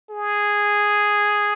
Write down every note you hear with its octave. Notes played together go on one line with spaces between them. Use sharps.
G#4